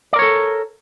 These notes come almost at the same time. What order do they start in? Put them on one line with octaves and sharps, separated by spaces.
D5 A#4 C#5 A4